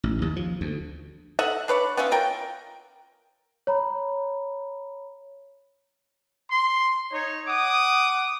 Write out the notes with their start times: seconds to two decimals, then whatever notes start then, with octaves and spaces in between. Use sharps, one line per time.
0.04 A1
0.22 D#2
0.36 F3
0.61 D2
1.39 A4 D#5 E5 F#5
1.68 D4 B4 C#5 D5
1.97 B3 C#4 F4 E5
2.11 F4 A#4 G5
3.67 C#5 A#5 B5
6.50 C6
7.12 D#4 C#5
7.47 F#5 D6 D#6